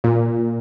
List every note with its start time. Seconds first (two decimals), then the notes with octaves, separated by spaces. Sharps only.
0.04 A#2